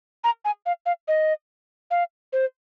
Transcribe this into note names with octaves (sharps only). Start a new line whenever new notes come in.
A#5
G#5
F5
F5
D#5
F5
C5